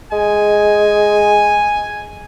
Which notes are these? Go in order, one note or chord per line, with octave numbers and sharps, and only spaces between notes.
G#3 G#5